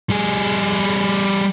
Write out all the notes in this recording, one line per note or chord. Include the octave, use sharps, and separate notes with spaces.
G3 G#4